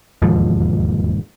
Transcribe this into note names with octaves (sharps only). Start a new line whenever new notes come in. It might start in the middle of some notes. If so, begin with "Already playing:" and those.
E1 D#2 G#2 F3